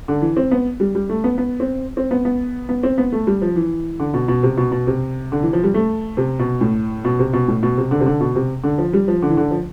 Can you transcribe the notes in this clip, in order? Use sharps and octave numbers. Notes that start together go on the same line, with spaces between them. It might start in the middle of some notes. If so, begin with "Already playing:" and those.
D3
E3
C4
B3
G3
G3
A3
B3
B3
C4
C4
B3
B3
B3
C4
B3
A3
G3
F3
E3
D3
B2
B2
C3
B2
B2
C3
D3
E3
F3
G3
A3
C3
B2
A2
B2
C3
B2
A2
B2
C3
D3
C3
D3
B2
C3
D3
F3
G3
F3
D3
E3
D3
F3